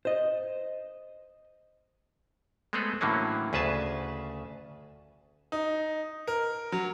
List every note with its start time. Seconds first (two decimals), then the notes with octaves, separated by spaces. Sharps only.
0.05 C5 D#5
2.73 G#3 A3 B3 C4 G#4 A4
3.01 A2 D3 E3 F#3 A#3 C#4
3.53 D2 C#3 G#4 B4 E5 A5
5.52 D#4
6.27 A#4
6.72 F#3